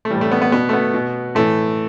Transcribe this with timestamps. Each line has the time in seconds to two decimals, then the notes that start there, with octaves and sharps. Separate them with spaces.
0.05 A3
0.11 A2 E3 G3
0.21 A3
0.32 B3
0.42 B3
0.52 B2 B3
0.69 A3
0.73 B3
0.94 B2
1.35 A2 E3 A3